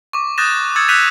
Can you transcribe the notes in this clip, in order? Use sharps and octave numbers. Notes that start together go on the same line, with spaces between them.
C#6 D6
D#6 F#6 G6 A6 A#6 E7
D#6 E6 G#6 A6 C#7
E6 F#6 G6 B6 D#7 F7